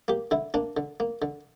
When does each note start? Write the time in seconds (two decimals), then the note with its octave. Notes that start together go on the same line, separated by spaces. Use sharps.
0.08 A#3 G4
0.31 D3 E4
0.54 A#3 D4
0.77 D3
1.00 A#3
1.22 D3